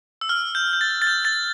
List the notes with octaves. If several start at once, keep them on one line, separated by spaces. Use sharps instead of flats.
E6
F6
G6
G6
A6
A6
G6
A6